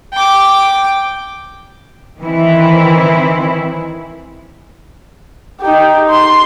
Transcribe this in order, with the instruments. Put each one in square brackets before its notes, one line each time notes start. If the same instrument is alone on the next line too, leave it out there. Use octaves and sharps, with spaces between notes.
[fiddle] G5 D6
[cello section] D#3 E3 C4 E4
[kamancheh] D#4 G4
C6